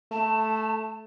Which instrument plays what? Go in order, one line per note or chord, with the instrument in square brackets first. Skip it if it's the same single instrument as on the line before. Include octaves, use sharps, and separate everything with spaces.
[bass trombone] A3 [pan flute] A5